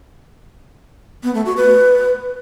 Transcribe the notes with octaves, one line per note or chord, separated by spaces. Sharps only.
B3
A3
F#4
B4